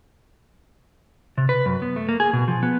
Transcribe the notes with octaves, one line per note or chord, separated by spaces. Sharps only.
C3
B4
F#2
B3
A3
A#3
G#4
B2
F3
B3